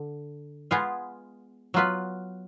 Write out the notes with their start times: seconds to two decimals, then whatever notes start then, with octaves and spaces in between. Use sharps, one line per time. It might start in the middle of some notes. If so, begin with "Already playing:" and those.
Already playing: D3
0.71 G#3 B3 F4 G#4
1.74 F#3 B3 F4 B4